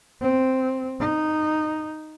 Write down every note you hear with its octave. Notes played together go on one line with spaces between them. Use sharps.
C4
D#4